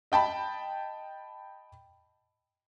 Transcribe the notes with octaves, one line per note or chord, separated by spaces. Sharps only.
D#5 G5 A5 B5